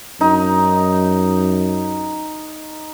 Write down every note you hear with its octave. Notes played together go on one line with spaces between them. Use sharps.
F#2 D#4